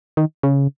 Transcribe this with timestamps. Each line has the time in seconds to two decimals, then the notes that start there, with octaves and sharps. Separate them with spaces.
0.17 D#3
0.43 C#3